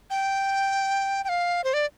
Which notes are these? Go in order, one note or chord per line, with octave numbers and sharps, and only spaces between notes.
G5
G5
F5
C5
D5